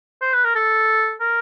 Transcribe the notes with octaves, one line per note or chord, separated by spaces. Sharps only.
C5
B4
A#4
A4
A#4